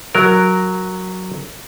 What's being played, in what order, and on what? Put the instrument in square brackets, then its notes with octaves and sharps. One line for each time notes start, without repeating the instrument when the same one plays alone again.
[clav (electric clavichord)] F#3 A#4